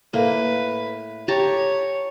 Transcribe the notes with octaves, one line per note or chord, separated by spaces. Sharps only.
A2 A#3 B4
G4 C#5 A5 A#5